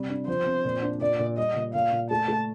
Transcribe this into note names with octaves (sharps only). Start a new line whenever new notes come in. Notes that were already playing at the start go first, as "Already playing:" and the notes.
Already playing: C3 G3
D4
F3 C5
C4
A#2
D4
A#2 D5
A#2
G3 D#5
A#2
A#2 F5
A#2
A3 A5
A3